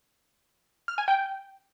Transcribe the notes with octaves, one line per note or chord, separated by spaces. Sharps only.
F6
G#5
G5